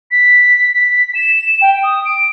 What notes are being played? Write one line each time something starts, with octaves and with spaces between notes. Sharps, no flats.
B6
B6
E7
G5
D#6
D7